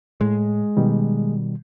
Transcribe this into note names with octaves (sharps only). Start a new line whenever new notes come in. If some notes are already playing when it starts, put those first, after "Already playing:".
A2 G#3
B2 D#3 G3